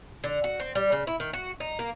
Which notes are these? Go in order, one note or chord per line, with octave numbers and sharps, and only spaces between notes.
D3
F#4
C4
G3
C#3
E4
D#3
F#4
D#4
A#3